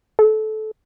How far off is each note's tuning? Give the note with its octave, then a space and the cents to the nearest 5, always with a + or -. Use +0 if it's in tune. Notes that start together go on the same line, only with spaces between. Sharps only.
A4 -20